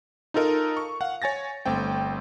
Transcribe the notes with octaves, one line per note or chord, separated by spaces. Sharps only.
D#4 F4 A4 A#4 D#5
C#6
F5 F#5
C#5 G#5 A6 A#6
G1 A3 C4 G5